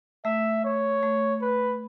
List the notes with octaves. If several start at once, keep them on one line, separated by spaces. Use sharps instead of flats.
A3 E5
C#5
A3
B4